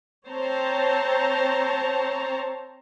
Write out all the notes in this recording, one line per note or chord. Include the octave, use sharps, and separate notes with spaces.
C4 C5 C#5 A5 A#5